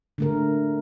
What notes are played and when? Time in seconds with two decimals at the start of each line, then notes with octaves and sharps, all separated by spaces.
0.18 D3 A3 A#4